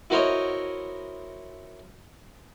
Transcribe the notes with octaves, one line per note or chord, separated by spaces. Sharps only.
E4 F#4 A#4 C5 C#5 D#5